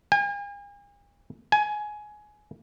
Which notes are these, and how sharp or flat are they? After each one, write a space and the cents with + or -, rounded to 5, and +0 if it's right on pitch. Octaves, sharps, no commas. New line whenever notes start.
G#5 -45
G#5 +15